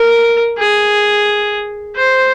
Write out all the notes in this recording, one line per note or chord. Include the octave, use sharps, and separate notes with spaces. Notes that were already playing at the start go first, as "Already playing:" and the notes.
Already playing: A#4
G#4
C5